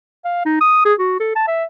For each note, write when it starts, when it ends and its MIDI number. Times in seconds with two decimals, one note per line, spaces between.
0.25 0.44 77
0.45 0.58 63
0.61 0.81 87
0.85 0.94 68
0.99 1.15 66
1.20 1.33 69
1.35 1.44 81
1.47 1.64 76